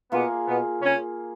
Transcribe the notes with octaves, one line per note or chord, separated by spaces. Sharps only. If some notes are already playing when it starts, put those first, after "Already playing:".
B2 A#3 B3 F4 G#4
B2 B3
C#3 C#4